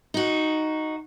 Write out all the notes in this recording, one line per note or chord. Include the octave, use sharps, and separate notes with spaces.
D#4 F#4